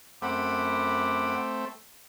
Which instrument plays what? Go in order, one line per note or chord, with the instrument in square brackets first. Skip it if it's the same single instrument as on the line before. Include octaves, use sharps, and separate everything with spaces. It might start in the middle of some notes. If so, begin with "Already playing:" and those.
[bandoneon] F#2 F#5 B5 [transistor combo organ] A3 C4 [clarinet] D6